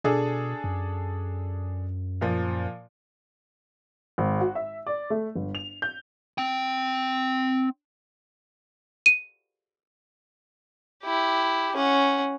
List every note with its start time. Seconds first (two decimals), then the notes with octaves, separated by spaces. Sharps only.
0.04 B2 D4 G#4 A4
0.64 F#2
2.21 A#2 F3
4.18 G#1
4.41 F#4
4.55 E5
4.87 D5
5.10 A3
5.35 G1
5.55 F7
5.82 G6
6.38 C4 G5
9.06 D#7
11.04 E4 G4
11.76 C#4 F#5